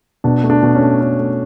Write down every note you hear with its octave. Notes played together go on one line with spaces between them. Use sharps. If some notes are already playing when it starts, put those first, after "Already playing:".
B2 D4
A3
D4
B2
C#4
A3
A3 C#4
A3